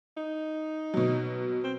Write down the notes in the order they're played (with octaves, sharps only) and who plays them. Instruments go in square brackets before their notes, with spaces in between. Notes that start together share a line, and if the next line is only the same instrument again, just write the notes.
[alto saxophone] D#4
[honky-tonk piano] B2 F#3
[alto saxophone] C4